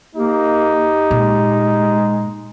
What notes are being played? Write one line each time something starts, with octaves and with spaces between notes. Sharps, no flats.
A#3 D#4 G4
A#2 G#3